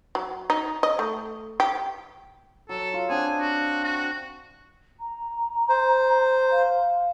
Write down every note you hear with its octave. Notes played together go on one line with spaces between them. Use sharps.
F#3
D#4
D#5
A3
G4
F#3 A4
F4
C4 D4 G#4 F#5
F#4
F#4
A#5
C5
F5